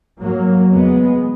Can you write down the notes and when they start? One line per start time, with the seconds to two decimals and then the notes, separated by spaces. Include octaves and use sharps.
0.20 G#2 F#3 A#3
0.69 E2 C#3 G#3 B3